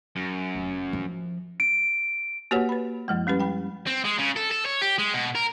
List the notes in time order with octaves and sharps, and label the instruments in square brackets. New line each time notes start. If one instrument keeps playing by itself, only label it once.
[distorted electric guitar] F#2
[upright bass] F1
F3
[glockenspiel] D7
[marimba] A#3 F#4 G4 B4 C#5 F#5
B4 B5
F#2 F3 G#3
G3 C#4 G4 B4
G5 B5
[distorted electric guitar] C4
G#3
C#3
A4
A4
C#5
G4
G#3
B2
A#4